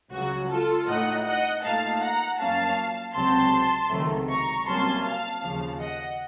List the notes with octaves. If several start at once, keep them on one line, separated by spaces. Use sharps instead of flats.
C#2 C#3 F#3 F#4
F4 A4
A2 A3 D#4 D#5 F#5
D#5 F#5
A#2 A3 D#4 F5 A5
F#5 A#5
F#2 F3 A#3 C#4 F5 A5
C#2 C3 F#3 C4 A5 C6
C#2 C3 D#3 F#3 A3
A#5 C#6
C2 C3 F#3 A#3 C#4 A5 C6
F5 A5
D#2 C#3 F3
D#5 F#5